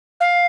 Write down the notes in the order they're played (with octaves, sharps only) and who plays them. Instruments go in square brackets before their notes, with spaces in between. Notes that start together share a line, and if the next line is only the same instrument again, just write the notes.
[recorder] F5